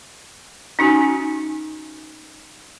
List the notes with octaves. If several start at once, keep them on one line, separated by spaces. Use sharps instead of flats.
C#4 D#4 F#4 G#5